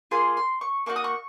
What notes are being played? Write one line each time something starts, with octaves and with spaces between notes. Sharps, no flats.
A#3 F4 G#4 C6
C6
C#6
A#3 D#4 F#4 C#6
D#6
C#6